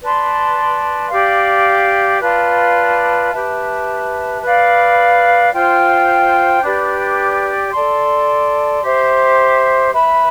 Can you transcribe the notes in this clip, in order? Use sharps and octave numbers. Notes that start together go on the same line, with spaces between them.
B4 D5 A5 C6
G4 D5 F5
F4 B4 D5 A5
G4 B4 E5 A5
B4 D5 F5
F4 C5 G5
D4 G4 B4 D5
A4 D5 A5 C6
G4 C5 E5
B4 E5 B5